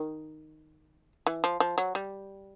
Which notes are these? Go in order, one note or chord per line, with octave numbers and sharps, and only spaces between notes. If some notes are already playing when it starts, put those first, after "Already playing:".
Already playing: D#3
E3
F3
F3
F#3
G3